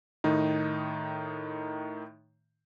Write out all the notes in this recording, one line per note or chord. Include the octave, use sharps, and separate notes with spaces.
A2 D#3 D#4